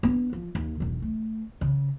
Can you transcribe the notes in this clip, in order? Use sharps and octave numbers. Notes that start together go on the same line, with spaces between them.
B3 D4
F3
D#2
E1 B1
A3
C#3